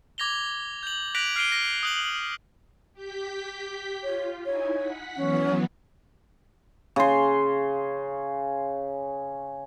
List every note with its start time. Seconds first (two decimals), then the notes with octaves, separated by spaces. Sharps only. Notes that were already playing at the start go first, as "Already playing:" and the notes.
0.18 D6 G#6 A#6 F7 G7
0.83 G6 F#7
1.15 F#6 A#6 B6 D7 F7 F#7
1.36 F6 C7 D7 D#7 G7
1.52 A#6
1.83 D#6 F#6 F#7
2.94 G4 G6 B6
4.03 F4 C#5
4.46 D#4 E4 C#5 G#5
4.75 F#5 B6
5.16 E3 F#3 B3 C#4
6.96 C#3 C6